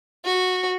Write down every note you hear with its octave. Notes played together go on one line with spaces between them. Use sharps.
F#4